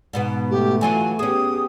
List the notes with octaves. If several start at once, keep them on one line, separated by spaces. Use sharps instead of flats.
G#2 B2 B3
A3 G4
E3 F#3 F4 G#5
B3 C#4 G4 G#4 D#6